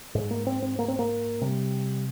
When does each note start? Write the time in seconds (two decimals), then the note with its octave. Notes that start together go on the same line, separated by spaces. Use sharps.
0.15 G#2 G#3
0.31 A#3
0.47 C4
0.62 C4
0.79 A#3
0.88 C4
0.99 A#3
1.41 C3 G3